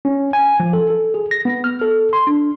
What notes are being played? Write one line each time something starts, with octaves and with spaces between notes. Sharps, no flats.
C#4
G#5
F3
A4
A4
G#4
A#6
B3
F6
A4
C6
D4